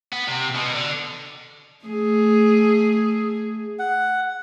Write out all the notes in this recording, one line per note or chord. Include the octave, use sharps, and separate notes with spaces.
B3
C3
B2
D3
A3 G#4
F#5